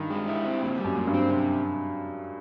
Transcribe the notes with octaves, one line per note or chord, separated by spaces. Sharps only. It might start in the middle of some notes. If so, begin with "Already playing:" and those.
Already playing: G2 D#3
G#3
E4
C4
A#2
G3
F#2
A#2
G2
C4
C3